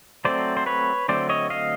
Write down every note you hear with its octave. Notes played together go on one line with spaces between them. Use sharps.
F#3 A3 C4 C5 D5
C5
B4 C#5
D3 F#3 A3 C4 C5 D5
C#5 D#5
D#5 F5